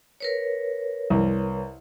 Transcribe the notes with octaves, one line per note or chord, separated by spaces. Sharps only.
A#4 B4 C#5
C2